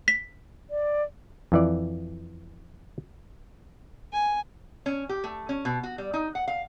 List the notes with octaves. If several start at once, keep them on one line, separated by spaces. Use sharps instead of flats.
B6
D5
F2 E3 D5
G#5
C#4
G4
A3
C#4
B2
F#4
G3
D#4
F#5
F5